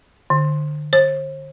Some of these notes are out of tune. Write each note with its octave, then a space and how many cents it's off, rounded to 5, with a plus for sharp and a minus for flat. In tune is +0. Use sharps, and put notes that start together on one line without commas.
D3 +30
C5 +45